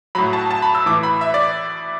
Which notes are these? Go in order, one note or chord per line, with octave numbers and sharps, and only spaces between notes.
A2 F#3 B5
A5
A5
B5
E6
A2 E3 D6
B5
E5
D5